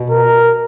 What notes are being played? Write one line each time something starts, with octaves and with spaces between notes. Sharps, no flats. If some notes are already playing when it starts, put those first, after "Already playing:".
Already playing: B2
A#4